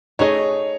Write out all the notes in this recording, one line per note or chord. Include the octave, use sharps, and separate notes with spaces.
A3 D#4 G#4 C#5 D#5